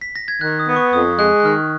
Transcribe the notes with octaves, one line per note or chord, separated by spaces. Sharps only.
B6
A#6
G#6
D#3 F#6
D#6
B3
C#6
F2 D#6
G#3 F#6
F#6
D#3 F6